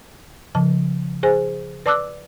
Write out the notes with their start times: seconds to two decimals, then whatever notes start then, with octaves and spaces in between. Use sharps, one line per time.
0.55 C#3 F3 A5
1.23 G#4 C5 G#5
1.86 B4 D5 A5 D6 E6 F#6